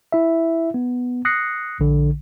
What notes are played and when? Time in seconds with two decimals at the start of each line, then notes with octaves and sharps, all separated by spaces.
0.12 E4 E5
0.74 B3
1.25 D#6 F#6 A#6 C7 C#7
1.80 A#1 D3